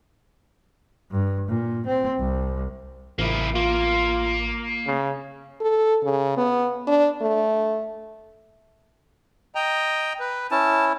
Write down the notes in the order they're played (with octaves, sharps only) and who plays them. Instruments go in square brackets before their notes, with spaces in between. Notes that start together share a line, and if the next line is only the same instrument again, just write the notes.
[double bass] G2
A#2
C4
C2
[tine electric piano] A1 [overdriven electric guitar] A#3 E4
[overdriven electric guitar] A#3 [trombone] F4
[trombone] C#3
[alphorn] A4
C#3
B3
D4
A3
[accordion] D#5 G5 A#5
B4
[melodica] C#4 E4 [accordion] A5